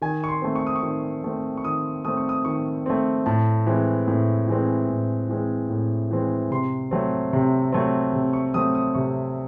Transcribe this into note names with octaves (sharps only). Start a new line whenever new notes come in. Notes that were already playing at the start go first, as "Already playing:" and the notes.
D#3 G#5
C#6
C6
A3 C4
C#6
D#6
C#6
D#3
A3 C4
C#6
D#3 D#6
A3 C4 D#6
C#6
D#6
D#3 C#6
A3 C4
A2 A5
E3 G#3 C4
A2
E3 G#3 C4
A2
E3 G#3 C4
A2
E3 G#3 C4
C3 C6
F#3 A3 C4
C3
F#3 A3 C4
C3
C#6
F#3 A3 C4 D#6
D#6
C3 C#6